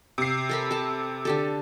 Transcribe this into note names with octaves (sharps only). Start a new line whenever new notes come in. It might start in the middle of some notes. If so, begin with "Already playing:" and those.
C3 C7
A4 A#4 B5
A4 A5
D3 G4 A4